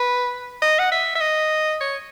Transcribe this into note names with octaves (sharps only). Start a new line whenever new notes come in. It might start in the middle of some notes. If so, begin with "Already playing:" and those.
Already playing: B4
D#5
F#5
E5
E5
D#5
C#5